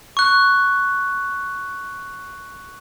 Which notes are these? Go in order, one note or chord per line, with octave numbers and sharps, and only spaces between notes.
C#6 F#6